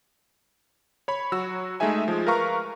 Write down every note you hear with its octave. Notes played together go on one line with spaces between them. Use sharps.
C#5 B5
F#3 F#4 E6
G#3 A3 D#4 G#4 E5 G#5
F3 G#3
A#4 B4 F5 A#5 C#6 F6